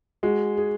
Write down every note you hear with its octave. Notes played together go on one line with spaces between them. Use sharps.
G#3 F#4
G#4